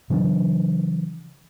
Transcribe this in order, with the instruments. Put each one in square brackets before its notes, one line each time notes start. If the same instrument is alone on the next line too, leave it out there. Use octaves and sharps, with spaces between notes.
[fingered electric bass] C#3 E3 F#3 D4